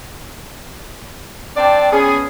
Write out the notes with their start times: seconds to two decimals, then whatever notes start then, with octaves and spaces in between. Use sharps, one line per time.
1.57 C4 D4 D5 G5 A5
1.92 B3 C#4 G#4